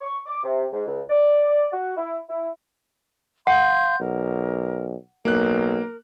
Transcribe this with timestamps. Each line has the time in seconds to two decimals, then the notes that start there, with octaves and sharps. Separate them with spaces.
0.02 C#6
0.26 D6
0.44 C3
0.72 G#2
0.87 C#2
1.10 D5
1.73 F#4
1.97 E4
2.29 E4
3.47 F5 F#5 C6 G6
4.00 B1 A#4
5.25 B1 A#3 A#4 F#6